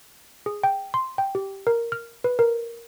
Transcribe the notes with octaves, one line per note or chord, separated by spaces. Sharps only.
G#4
G5
C6
G5
G4
A#4
F6
B4
A#4